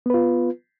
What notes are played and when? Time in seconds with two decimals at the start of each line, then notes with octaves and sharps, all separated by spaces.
0.06 B3
0.10 B4
0.14 F4